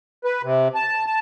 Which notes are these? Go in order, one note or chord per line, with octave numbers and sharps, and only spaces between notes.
B4
C3
A5
A5